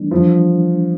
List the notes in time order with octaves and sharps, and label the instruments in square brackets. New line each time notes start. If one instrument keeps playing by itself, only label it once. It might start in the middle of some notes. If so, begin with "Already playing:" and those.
Already playing: [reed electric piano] E3 G3 A#3 D4
[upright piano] F3